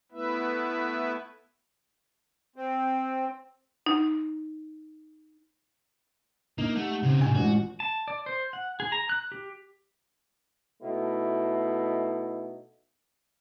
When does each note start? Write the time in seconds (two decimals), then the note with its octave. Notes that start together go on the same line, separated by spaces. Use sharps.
0.12 A3 B3 E4 B4 E5
2.56 C4
3.86 D#4
6.58 A#3 D#4
6.75 A3 G4 F#5
7.03 C#3 C4
7.21 A2 C3 G#5
7.35 A1 G#3 F4 F#4
7.80 A5
8.08 D5
8.26 C5
8.53 F#5
8.80 G#4
8.92 A#5
9.09 F#6
9.32 G4
10.82 B2 A3 D#4 E4